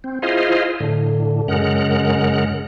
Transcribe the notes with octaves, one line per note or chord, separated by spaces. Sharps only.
C4
E4 F4 G#4 C5 D#5 F5
A2 D3
F#2 C#3 G#3 A#4 F#5